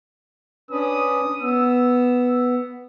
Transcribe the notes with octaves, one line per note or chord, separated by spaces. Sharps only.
C#4 D4 B4 D#6
B3 E6